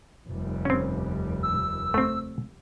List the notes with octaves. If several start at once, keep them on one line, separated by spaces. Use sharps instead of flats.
F1 D#2 G3
C4 C#4
E6
A3 C4